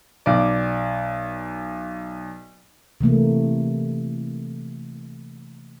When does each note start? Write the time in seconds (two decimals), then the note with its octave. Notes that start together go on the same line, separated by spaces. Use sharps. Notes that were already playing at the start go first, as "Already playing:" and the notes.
0.26 B1 D5
3.01 C3 E3 A3 A#3